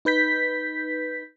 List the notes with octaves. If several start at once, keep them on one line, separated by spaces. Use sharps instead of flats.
D#4 B4 G6 B6